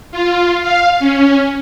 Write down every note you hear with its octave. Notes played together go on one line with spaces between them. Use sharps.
F4
F5
C#4